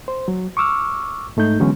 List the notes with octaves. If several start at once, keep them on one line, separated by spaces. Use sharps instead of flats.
C5
F#3
C#6 D6 E6 F6
G#2 A3 D#4 G6
D3 E3 F#3 G#3 B3 C#4